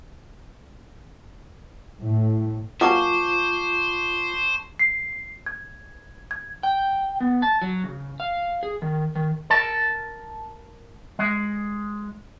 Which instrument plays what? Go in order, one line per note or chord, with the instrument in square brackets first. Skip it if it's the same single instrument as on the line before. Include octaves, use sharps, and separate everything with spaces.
[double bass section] A2
[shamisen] F#3 A#3 C#4 [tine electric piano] F4 [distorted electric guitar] C5 [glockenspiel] A5 C#6 D6
[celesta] C7
G#6
G#6
[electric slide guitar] G5
B3
A5
F#3
C#3
F5
G#4
D#3
D#3
[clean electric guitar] A#4 A5
G#3